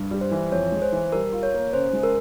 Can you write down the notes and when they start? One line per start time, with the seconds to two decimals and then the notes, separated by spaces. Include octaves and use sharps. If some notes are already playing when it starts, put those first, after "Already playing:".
Already playing: G2
0.11 G3
0.21 C5
0.31 E3
0.52 F2 C#5
0.72 G#3
0.82 C5
0.92 E3
1.12 G3 A#4
1.33 F4
1.43 C#5
1.54 A#3
1.73 C#3 C5
1.93 G#3
2.03 A#4